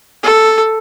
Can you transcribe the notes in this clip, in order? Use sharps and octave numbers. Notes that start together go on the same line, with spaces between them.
A4